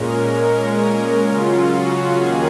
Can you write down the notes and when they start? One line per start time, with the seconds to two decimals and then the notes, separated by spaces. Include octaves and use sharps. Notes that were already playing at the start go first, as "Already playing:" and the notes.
Already playing: A#2 G#3 C#4 A#4
0.35 A#2 G#3 C#4
1.24 C#3 F#3 C#4 F4
1.69 F#4
2.14 D#2 D#3 A#3 C#4 G#4